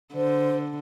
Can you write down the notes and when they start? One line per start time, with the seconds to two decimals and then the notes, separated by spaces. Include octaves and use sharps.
0.14 D3 C5